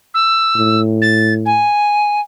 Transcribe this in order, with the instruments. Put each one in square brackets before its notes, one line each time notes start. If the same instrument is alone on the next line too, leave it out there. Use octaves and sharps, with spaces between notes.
[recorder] E6
[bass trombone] A2
[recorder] A6
G#5